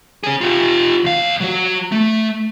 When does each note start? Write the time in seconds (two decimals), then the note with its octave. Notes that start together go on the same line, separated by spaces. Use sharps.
0.24 C#4 G#4
0.41 F4 G4
1.04 D#2 F5
1.40 F#3 F#4
1.92 A3